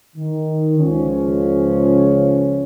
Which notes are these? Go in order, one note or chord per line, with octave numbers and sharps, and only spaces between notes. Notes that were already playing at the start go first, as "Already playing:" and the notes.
D#3
C#2 C#3 F3 C#4